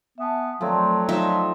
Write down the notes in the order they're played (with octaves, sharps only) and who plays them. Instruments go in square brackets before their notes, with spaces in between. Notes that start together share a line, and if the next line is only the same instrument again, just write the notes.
[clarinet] B3 [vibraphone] E5 G#5 A5
[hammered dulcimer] F3 A3 C4 [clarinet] F#3 [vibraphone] A4 D5 A5
[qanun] D#4 F4 E5